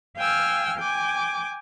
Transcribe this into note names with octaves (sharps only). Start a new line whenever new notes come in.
F5 G5 G#5 E6 F6
G5 G#5 D6